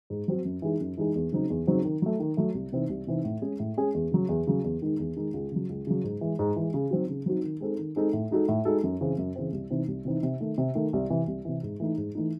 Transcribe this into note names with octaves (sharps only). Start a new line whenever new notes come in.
G#2
F#3 C4 F#4
F#2
E3 G#3 D#4 G#4
F#2
E3 G#3 D#4 G#4
E2
C#3 F#3 C4 D#4
E2
C#3 F#3 C4 D#4
D#3
F#3 A3
D#3
F#3 A3
C2
C3 E3 C4 D#4
C2
C3 E3 C4 D#4
A2
G#3 C#4 G#4
A2
G#3 C#4 G#4
E2
C#3 F#3
E2
C#3 F#3
E2
D#3 G#3 D#4
E2
D#3 G#3 D#4
C#2
C#3 F#3
C#2
C#3 F#3
G#2
E3 G#3
G#2
E3 G#3
C#3
F#3 C4 D#4 F#4
C#3
F#3 C4 D#4 F#4
D#3
G#3 C4 D#4 A4
D#3
G#3 C4 D#4 A4
A2
G#3 D#4 F#4 A4
A2
G#3 D#4 F#4 A4
F#2
C#3 E3 C4
F#2
C#3 E3 C4
C2
C3 E3 C4 D#4
C2
C3 E3 C4 D#4
C3
D#3 A3
C3
D#3 A3
C2
C3 E3
C2
C3 E3
G#2
E3 A3 D#4
G#2
E3 A3 D#4